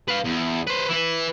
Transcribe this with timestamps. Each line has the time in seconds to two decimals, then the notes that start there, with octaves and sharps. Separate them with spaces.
0.08 B4 F5
0.24 E2
0.67 B4 C5
0.89 E4 B4